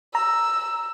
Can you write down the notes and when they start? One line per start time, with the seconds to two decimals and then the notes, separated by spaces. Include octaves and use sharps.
0.15 A#5 E6